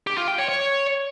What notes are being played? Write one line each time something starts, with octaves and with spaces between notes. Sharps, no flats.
G4
F4
G5
C#5
C#5